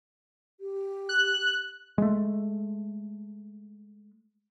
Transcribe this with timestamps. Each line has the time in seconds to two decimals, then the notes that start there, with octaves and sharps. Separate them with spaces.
0.60 G4
1.09 F#6
1.98 G#3 A3